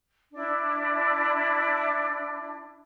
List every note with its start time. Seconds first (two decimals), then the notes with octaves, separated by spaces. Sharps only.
0.33 D4 E4